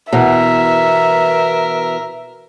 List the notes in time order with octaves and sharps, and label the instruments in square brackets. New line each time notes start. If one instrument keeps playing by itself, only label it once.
[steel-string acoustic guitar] B2 E3 [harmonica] A#4 [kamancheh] E5